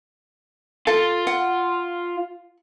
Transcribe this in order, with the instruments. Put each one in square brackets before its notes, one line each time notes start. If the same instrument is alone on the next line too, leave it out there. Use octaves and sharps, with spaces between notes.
[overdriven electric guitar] F4 [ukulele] A4
[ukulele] F#5